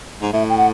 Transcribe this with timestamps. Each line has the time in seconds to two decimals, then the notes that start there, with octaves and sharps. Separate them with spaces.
0.22 G#2
0.33 A2 E5
0.49 G5
0.57 F#5